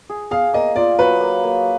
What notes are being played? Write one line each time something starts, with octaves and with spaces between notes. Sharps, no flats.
G#4
G#4 F5
A#3 D#5
F4 D5
F#3 B4
A#3
A#3